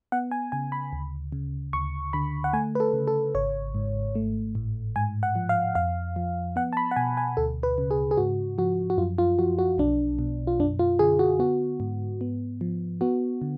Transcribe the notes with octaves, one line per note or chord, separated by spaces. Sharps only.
B3 F#5
G#5
C#3 G#5
B5
D2
C#3
D2 C#6
D3 B5
F#5
A3 G#5
B4
A4
C#3
A4
G#1 C#5
G#2
A3
A2
G#2 G#5
F#5
F3
F5
F2 F5
F3
B3 F#5
A5
B5
F#5
B2 G#5
G#5
D2 A4
B4
C#3
G#4
G#4
G#2 F#4
F3 F#4
F#4
F#2 F4
F4
F3 F#4
F#4
B1 D4
B2
F4
F#2 D4
F4
D3 G#4
F#4
B3 F#4
G#2
B3
F3
B3 F#4
D3